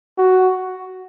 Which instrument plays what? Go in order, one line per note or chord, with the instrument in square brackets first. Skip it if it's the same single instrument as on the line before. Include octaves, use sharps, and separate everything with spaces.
[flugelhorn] F#4